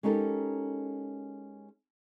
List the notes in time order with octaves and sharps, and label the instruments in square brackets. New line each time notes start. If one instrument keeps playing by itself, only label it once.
[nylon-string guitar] G#3 C#4 D#4 G4 A4 A#4